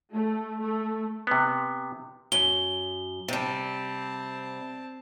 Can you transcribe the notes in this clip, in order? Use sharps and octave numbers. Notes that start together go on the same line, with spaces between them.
A3
A3
C3 B3
F#2 G7
C3 G3 C4 A5